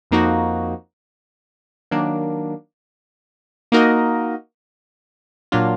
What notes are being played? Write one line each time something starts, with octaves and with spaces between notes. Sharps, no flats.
F2 F3 A#3 D#4 F#4
D#3 F#3 A#3 D4
A#3 D#4 F#4 A#4 D#5
A#2 F#3 D4 F4